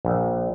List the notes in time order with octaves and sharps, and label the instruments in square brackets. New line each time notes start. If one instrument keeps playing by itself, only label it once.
[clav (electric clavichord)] A#1